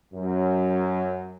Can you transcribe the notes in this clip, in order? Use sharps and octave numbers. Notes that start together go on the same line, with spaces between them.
F#2